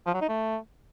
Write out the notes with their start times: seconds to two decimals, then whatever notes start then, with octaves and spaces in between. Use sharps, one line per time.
0.06 F3
0.14 F#3
0.21 D#4
0.29 A3